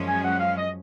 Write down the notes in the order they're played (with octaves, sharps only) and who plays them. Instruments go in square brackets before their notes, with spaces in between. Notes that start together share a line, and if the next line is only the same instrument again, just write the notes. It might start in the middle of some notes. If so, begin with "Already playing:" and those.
Already playing: [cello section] F#2 F3 G#3 C#4
[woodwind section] G#5
F#5
F5
D#5